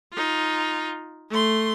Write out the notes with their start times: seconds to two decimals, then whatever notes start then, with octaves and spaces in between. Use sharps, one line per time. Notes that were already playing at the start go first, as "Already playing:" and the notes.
0.13 D#4 F4
1.30 A3 C6